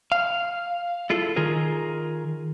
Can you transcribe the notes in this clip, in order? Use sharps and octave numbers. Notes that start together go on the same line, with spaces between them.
F5
E4 F4 G#4 A4
D#3 F4 G#4 A#4